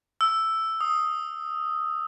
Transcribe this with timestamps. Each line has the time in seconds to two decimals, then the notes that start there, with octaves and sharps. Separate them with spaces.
0.21 E6
0.81 D#6